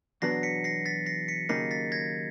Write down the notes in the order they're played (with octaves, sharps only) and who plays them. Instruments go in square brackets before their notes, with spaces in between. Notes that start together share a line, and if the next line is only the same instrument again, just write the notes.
[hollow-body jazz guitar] E2 B2 F#3 B3 D4 [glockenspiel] A#6 C7
[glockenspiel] B6 C#7
A#6 C7
A6 B6
A#6 C7
B6 C#7
[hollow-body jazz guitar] D#2 C#3 F#3 A#3 D#4 [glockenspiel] A#6 C7
[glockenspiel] A6 B6
G#6 A#6